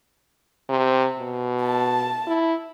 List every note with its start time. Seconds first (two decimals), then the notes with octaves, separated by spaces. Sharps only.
0.69 C3
1.19 B2
1.62 A5
2.27 E4